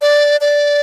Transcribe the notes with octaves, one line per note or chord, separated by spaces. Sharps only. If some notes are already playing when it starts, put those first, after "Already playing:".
D5
D5